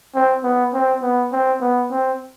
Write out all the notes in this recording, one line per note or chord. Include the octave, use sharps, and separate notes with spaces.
C4
B3
C4
B3
C4
B3
C4